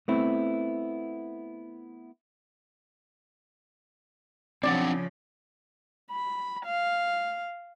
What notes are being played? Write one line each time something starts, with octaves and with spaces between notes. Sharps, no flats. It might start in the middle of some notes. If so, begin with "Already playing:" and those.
A3 B3 C4 E4
C#3 F3 C4 D4 D5 F#5
B5
F5